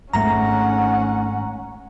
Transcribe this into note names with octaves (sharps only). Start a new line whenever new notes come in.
G#1 G#2 A3 C#4 F#5 A#5